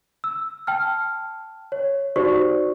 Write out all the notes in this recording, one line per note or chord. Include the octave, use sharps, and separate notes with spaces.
E6
G5 A5 F6
C#5
D#4 F#4 G4 C5 D5 C#6